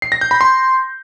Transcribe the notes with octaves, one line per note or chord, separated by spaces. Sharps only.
C7
A#6
G6
B5
C6